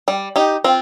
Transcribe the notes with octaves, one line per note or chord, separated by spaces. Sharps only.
G3
D#4 G4
C4 F4